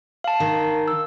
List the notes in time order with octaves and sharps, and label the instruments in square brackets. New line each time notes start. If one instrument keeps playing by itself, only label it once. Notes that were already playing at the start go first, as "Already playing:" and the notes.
[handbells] F5 A5
[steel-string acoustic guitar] D#3
[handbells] E6